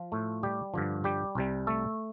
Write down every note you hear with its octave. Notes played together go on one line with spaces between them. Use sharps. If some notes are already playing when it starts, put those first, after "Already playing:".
Already playing: F3 F4
A2 A3
G3 G4
G2 D3 F3
G3 G4
C2 C3 G3
A3 A4